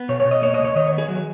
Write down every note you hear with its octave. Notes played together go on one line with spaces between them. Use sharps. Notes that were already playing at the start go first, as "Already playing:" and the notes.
Already playing: B3
B2 C#5
C#5
B2
D#5
A#3 C#5
C#2 D#5
C#5
D#3 D#5
C#5
B3
G#4
F#3